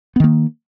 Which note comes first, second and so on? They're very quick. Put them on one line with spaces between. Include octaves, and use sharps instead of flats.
B3 D#3 A#3